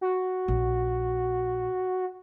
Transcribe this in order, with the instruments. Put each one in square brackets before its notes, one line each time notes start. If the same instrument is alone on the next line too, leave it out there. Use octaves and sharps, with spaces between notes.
[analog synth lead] F#4
[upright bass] A#1